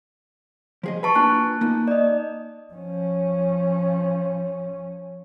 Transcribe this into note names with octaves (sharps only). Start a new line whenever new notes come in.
F3 G#4 D#5
B4 A5 B5 C#6
A#3 D4 F4 G#5 A5 F#6
A#3 D#4
D5 D#5
F3 C#4